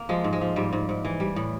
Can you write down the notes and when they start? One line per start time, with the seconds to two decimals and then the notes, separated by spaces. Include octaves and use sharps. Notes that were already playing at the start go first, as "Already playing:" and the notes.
Already playing: A#3
0.09 F3 G#3
0.24 G#2
0.33 G#3
0.41 F3
0.56 G#2 G3
0.73 G#2
0.89 G#2
1.05 E3
1.20 G3
1.36 A2